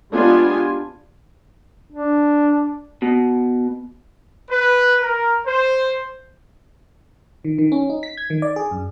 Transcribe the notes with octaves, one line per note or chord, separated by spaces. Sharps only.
G#3 B3 D4 F4 G4 G#5
D4
B2
B4
A#4
C5
D#3
D#3
C#4
D#4
B6
G#6
D#3
D5
G#4
F#2